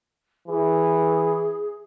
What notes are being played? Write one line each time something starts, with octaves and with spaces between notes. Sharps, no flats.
E3 G#4